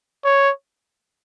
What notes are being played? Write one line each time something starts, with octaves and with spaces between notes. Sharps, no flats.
C#5